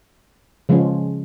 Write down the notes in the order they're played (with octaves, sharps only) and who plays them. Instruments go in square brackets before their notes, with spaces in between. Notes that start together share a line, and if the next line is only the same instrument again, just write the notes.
[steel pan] C#3 F3 G#3 C#4